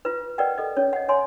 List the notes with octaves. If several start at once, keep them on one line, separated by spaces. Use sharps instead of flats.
F4 B4
A#4 B4 D5 D#5 F#5 G5
A4 D#5
C#4 C#5
D#5 F#5
C#5 G#5 C6